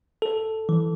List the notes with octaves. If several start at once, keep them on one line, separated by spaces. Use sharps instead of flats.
A4
E3